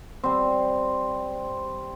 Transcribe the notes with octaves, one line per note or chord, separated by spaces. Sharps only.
G3 C4